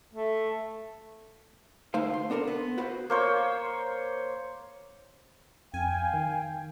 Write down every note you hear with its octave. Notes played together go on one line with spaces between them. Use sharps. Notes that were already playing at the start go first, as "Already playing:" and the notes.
A3
D2 A3 D#4 C5 F5
C6
B3 D4 A4 A#4 C5
B3
F#4 B4 C5
A#3 C5 C#5
F2 F5 G5 G#5
D#3